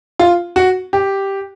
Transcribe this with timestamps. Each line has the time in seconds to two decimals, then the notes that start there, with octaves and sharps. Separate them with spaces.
0.19 F4
0.56 F#4
0.93 G4